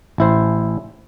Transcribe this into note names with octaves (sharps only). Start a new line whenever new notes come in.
A1 E4 C5